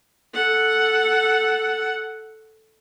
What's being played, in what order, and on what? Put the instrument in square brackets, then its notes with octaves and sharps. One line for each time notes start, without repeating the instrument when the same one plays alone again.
[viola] A4 F#5